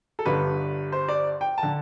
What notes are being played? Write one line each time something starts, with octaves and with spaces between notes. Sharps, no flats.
A4
G1 G2 D3 B4
C5
D5
G5
A5
D3